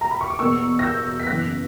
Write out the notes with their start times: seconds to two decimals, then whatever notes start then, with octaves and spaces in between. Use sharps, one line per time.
0.01 A#5
0.11 B5
0.21 C#6
0.30 D6
0.39 E2 B2 A#3 C#6 E6
0.79 A#6
0.83 E6 G6
1.20 B6
1.27 F#1 F#2 E3 B3 F#6 A#6